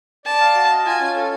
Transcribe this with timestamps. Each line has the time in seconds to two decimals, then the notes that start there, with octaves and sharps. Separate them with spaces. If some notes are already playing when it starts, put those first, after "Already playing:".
0.25 D5 A5
0.40 F5
0.55 F#4
0.70 D#5
0.86 F4 G#5
1.00 C#4
1.16 A4